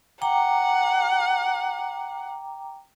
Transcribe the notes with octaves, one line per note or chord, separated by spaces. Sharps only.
F#5 G5 A#5 D6